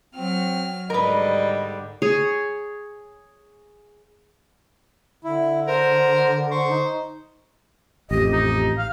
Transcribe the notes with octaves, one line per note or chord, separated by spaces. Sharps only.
F#3 C4 F6
G#2 D3 G3 A#4 B4 D#5
G#4 C#5
D3 E4
A#4 C5
C5 C#6
D#4
A1 F2 G4 D#5
D#4
F5